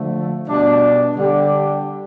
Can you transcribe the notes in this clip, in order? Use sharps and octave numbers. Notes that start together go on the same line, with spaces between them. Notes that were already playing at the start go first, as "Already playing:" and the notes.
Already playing: D3 F3 A3
B2 G3 D4
D3 G3 D4 G4